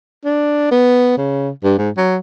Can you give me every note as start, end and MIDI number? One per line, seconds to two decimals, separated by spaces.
0.25 0.69 62
0.71 1.16 59
1.18 1.50 49
1.64 1.76 43
1.78 1.90 44
1.97 2.17 54